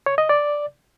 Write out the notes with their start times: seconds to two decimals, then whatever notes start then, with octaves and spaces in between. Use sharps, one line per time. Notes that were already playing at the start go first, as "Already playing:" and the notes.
0.06 C#5
0.18 D#5
0.29 D5